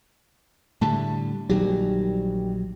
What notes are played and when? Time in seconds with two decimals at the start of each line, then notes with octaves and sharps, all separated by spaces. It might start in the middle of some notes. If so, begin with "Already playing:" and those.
0.81 A2 D3 G3 A5
1.49 A#1 D#3 F#3 G3